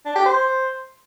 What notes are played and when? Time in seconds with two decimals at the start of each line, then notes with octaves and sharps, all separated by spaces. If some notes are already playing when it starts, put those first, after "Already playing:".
0.06 D4
0.16 G4
0.25 C5